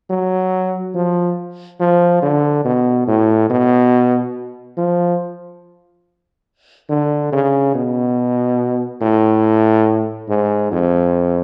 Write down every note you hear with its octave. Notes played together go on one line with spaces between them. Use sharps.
F#3
F3
F3
D3
B2
A2
B2
F3
D3
C#3
B2
A2
G#2
F2